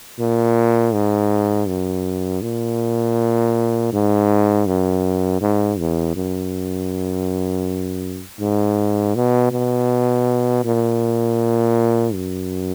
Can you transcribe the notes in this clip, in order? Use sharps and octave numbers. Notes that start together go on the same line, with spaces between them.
A#2
G#2
F#2
A#2
G#2
F#2
G#2
E2
F#2
G#2
B2
B2
A#2
F#2